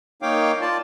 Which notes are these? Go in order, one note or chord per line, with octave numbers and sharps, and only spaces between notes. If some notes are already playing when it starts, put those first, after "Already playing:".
A#3 D#4 C#5 F5 G5 D6
F4 D5 A5